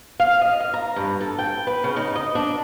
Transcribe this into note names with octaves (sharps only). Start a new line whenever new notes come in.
F5
D#5
F5
A#5
G2
A4
G5
B4
C#3
D#4
D#5
D4